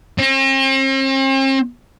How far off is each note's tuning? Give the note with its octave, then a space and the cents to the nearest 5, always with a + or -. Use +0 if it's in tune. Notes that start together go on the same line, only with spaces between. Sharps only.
C4 +45